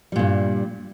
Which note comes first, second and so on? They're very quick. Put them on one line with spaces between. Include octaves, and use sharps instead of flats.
G3 A#2 G2